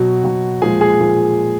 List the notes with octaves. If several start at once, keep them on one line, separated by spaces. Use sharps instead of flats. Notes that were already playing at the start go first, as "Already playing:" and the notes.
Already playing: B2 F#3 F#4
B2 F#3
A#2 F3 G#3 G#4 G#5
G#4 G#5
A#2 F3 G#3